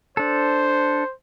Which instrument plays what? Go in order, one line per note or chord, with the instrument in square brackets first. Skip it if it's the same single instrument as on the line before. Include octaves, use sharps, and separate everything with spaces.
[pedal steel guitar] D4 A4 [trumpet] C5